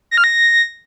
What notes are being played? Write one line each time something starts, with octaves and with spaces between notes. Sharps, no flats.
A#6
F6
A#6